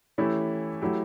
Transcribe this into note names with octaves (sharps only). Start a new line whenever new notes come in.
E3 A3 C#4 E4 G4
F#3 A3 E4 G4